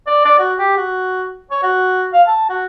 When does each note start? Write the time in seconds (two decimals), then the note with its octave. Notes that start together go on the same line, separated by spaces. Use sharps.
0.07 D5
0.25 D5
0.39 F#4
0.58 G4
0.77 F#4
1.51 C#5
1.63 F#4
2.13 F5
2.28 A5
2.49 F#4